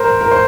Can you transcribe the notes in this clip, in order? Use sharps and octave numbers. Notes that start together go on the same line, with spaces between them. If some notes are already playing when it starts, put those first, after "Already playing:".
Already playing: A#4 C5
A#4
C5